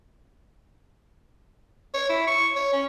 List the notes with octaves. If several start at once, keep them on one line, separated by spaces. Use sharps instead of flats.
C#5
E4
C#6
C#5
C#4